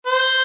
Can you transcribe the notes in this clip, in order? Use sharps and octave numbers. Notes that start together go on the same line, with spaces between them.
C5